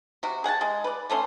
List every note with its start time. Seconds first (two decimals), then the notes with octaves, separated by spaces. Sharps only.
0.23 C3 F#4
0.44 G#4 F#5 G#5 A5
0.61 G#3
0.84 B4 D5
1.10 D3 A3 C#4 C6